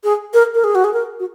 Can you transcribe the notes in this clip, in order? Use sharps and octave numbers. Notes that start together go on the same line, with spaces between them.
G#4
A#4
A#4
G#4
F#4
G#4
A#4
F#4